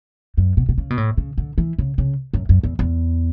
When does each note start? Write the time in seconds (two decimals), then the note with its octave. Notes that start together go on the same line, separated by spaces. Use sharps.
0.37 F#2
0.57 B2
0.69 B2
0.78 C#3
0.90 B2
0.98 A2
1.17 C#3
1.38 D3
1.58 E3
1.78 C#3
1.98 C#3
2.34 F#2
2.49 F#2
2.63 E2
2.79 E2